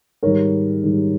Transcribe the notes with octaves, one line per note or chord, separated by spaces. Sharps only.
G#2 D#3 G3 A#4 C#5
G#2 D#3 G3